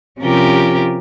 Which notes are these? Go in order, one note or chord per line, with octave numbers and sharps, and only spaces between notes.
C3 F3 C#4 F4 G4 A#4